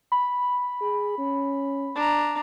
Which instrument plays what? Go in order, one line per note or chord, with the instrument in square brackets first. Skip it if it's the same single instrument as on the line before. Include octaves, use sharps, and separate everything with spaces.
[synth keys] B5
[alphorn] G#4
C#4
[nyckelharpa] D4 A#5